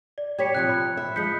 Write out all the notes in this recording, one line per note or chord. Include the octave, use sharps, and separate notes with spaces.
D5
G3 G4 C#5 G#6 B6 C#7
C3 F3 F4 G5 F#6 G#6 C#7
B5
E5
F3 G#3 G6 B6 C#7